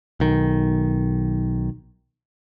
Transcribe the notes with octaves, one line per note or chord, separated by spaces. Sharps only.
B1 D#3